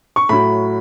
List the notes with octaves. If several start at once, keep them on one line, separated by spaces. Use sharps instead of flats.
C#6
A2 F#3 B5